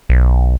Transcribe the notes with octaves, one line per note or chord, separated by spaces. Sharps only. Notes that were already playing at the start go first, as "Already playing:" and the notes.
B1